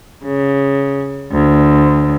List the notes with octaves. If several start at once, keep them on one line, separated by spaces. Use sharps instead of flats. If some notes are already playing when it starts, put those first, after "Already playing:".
C#3
D2